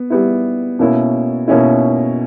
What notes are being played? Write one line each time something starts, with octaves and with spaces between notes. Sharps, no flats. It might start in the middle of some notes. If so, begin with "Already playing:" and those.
Already playing: B3
G3 B3 E4
B2 A#3 C#4 E4
B2 A#3 C#4 E4